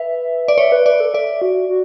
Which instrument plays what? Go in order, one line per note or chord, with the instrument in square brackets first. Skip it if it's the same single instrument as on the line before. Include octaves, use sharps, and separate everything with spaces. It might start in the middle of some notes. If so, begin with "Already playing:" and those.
Already playing: [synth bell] B4 [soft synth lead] E5
[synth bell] D5
[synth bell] C#5 [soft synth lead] E5
[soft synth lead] B4
[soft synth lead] B4 [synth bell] D5
[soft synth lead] A4
[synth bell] D5 [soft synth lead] E5
[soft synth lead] F#4
F#4